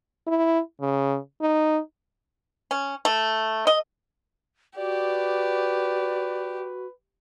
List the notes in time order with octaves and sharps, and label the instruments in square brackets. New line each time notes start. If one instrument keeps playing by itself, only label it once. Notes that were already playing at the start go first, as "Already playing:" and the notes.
[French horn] E4
C#3
D#4
[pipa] C#4
A3
D#5
[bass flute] F#4 [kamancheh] G4 [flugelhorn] B4 [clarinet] D5